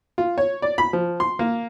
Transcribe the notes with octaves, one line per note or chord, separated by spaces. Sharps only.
F4
C#5
D5
B5
F3
C6
A#3